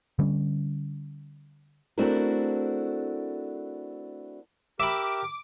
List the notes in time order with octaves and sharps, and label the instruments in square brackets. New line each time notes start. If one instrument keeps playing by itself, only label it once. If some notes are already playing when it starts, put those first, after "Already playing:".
[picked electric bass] D3 G3 C#4
[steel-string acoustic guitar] A3 C4 D4 E4 F#4 A#4
[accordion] G4 A#4 [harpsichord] E5 B5 [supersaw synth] D6